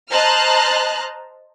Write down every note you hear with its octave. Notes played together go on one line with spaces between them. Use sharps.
C5 D#5 A5 A#5 F6 F#6